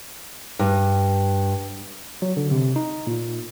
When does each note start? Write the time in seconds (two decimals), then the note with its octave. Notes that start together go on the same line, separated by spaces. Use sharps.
0.59 G2
2.22 F#3
2.37 D3
2.51 C3
2.76 D#4
3.07 A#2